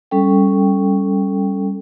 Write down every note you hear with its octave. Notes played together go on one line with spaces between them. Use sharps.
G3 C#4 A4 G5